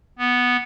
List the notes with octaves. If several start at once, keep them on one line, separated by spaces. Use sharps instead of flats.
B3